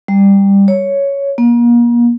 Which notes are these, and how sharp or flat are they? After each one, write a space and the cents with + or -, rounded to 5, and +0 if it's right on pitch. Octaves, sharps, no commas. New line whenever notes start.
G3 +15
C#5 +5
A#3 +35